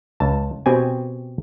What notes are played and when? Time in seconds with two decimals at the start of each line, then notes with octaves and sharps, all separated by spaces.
0.20 C#2 A5
0.66 B2 C4 G4 G#5